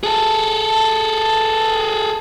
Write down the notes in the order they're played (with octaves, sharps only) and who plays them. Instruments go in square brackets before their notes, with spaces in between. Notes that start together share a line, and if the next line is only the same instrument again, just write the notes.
[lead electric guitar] G#4 A4